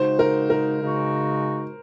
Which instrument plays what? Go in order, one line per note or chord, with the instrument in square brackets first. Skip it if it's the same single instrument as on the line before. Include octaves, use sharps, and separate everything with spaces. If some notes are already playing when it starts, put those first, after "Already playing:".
Already playing: [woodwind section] C#3 G#3 D#4 F#4 [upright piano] C5
[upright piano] A#4
A#4
[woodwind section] C#3 G#3 D#4 F#4